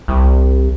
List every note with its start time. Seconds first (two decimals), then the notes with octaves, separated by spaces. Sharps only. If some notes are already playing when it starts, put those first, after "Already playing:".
0.08 C2